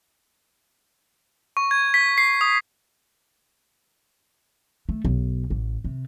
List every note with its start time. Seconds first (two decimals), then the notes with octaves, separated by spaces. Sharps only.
1.57 C#6
1.71 G#6
1.94 B6
2.18 C7
2.41 D#6
4.89 A3
5.05 B1
5.50 A1
5.85 C3